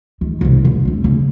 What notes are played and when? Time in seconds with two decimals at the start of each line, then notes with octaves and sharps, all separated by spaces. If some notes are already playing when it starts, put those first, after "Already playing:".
0.21 D#3
0.41 C2 B2
0.65 D3
0.85 E1 C4
1.04 C#3